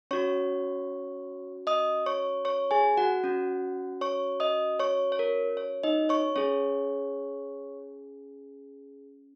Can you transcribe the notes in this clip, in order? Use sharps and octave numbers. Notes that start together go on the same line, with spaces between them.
C#4 F#4 C#5 C#6
D#5 D#6
C#5 C#6
C#5 C#6
G#4 G#5
F#4 F#5
C#4 F#4
C#5 C#6
D#5 D#6
C#5 C#6
C#5
A#4
C#5
D#4 D#5
C#5 C#6
C#4 G#4 C#5 C#6